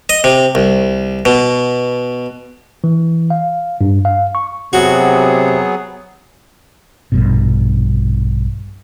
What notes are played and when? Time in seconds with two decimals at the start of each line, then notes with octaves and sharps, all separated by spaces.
0.09 D#5
0.24 C3
0.55 C2
1.25 B2
2.84 E3
3.30 F5
3.81 G2
4.05 F5
4.35 C#6
4.73 C3 F#3 B3 F#4 G#4
7.12 A#1 G2 B2